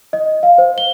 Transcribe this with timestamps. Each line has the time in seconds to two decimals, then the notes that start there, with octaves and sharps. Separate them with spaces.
0.13 D#5
0.43 F5
0.58 C5
0.78 G7